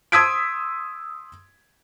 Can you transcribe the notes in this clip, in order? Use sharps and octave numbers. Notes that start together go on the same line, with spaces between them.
C6 D#6 E6 G#6 B6 D7